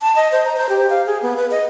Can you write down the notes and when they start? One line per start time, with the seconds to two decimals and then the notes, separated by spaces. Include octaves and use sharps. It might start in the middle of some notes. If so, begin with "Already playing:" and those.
0.02 A5
0.16 D#5
0.32 C5
0.45 A#5
0.56 C5
0.69 G4
0.90 F5
1.06 G#4
1.22 B3
1.37 B4
1.51 D#5